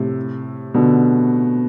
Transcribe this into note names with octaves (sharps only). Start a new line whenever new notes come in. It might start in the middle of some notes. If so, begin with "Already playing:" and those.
Already playing: A2 C3
B2 D3